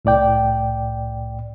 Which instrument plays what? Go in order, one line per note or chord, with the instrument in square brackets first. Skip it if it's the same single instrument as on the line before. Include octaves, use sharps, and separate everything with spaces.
[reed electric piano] C2 A2 D5 G5